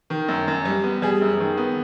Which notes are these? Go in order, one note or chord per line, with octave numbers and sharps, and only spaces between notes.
D#3
F#2
F#2
G3
B3
G3 G#4
F#2
D#3
B3